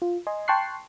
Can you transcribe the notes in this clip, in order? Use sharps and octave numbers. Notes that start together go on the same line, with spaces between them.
F4
D#5 G#5 C6
G5 A5 C6 C#6 F#6 C7